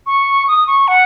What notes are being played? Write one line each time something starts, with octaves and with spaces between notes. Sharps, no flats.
C#6
D#6
C#6
F#5